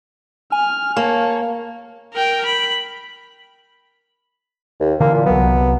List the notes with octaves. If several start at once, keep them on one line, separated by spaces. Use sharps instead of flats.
G#5 F6
A#3 C#5 A5
A#4 G5
B5
D#2
D3 E3 A#3
A#2
C2 F#3 B3